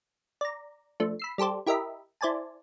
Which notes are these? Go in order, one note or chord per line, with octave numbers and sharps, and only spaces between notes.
D5 A#5
F3 A3 D4
B5 E6 C7
G3 G4 A4 C5 D5
E4 G4 A#4 D#5 E5 B5
E4 C5 D5 G#5 A5